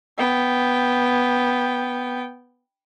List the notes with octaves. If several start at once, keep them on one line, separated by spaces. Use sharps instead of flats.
B3 G5